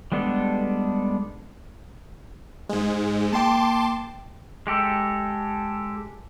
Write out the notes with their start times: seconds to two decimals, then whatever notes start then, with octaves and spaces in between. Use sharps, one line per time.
0.12 G3 G#3 B3 D4 A4
2.69 G#2 G#3
3.32 A#3 G5 A5 C6 D6
4.67 G#3 G4 A4